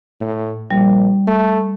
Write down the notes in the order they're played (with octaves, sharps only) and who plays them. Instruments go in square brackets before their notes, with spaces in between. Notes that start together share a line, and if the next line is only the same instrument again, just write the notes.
[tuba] A2
[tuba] A#1 [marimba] G3
[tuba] A3